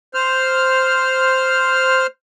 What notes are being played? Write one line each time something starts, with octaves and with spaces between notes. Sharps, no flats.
C5 F6